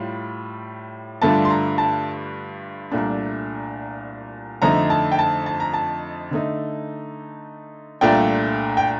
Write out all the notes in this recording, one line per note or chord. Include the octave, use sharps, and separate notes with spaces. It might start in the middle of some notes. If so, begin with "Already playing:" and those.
Already playing: A2 G3 F4
G2 D3 A3 D4 F4 A5
C6
A#5
A5
C2 A#2 A3 D4
F2 D3 A3 D#4 A#5
A5
G5
A5
A5
A#5
A5
D3 A3 D#4
C2 A#2 A3 D4 F4 G5
G5